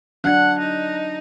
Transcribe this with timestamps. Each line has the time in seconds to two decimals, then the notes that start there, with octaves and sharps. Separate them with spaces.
0.24 F#3 D4 F#5 F#6 G#6
0.59 D#4